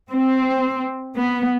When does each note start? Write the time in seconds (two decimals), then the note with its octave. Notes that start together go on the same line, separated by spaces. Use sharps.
0.12 C4
1.17 B3